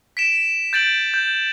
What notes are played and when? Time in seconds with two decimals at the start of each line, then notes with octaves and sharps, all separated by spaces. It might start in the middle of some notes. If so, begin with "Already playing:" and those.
0.17 B6 D7 E7
0.73 G6 A6 D7 F#7
1.14 G6